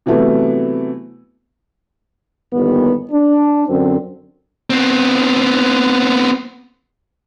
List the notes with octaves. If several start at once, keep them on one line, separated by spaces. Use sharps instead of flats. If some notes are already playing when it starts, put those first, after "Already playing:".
C3 E3 F#3 A3 B3
G1 D#2 B3
D4
F#2 D3 C4
B3 C4